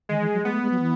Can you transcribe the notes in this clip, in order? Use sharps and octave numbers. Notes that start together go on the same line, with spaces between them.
D#3 G#3
E3
F#3
G#3 B3
A3
G#3
F#3
E3